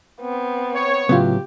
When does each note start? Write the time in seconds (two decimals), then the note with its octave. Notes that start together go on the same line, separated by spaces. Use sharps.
0.21 B3 C4
0.74 C#5
1.09 A2 C#3 F#3 B3 F4 G4